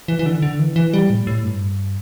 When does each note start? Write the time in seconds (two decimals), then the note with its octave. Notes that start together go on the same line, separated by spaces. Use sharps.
0.08 E3
0.19 E3
0.26 D3
0.42 D3
0.59 E3
0.76 E3
0.93 G3
1.10 A2
1.27 A2
1.44 G2